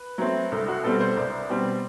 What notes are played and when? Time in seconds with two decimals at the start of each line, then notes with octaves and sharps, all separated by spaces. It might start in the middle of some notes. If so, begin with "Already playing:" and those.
Already playing: B4
0.18 F#3 A3 C4
0.52 C2 A4
0.68 F#4
0.83 B2 G3 C4 A4
1.00 C5
1.16 C2 D5
1.50 B2 G3 C4